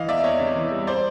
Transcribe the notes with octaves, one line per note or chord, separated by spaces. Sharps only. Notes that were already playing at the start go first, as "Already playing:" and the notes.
Already playing: E3 D#5 F5
E2 D5 E5
E2 C#5 D#5
C3
E3
G3
C5 D5